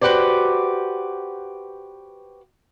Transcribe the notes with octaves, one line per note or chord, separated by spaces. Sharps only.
F#4 G4 B4 C5 D5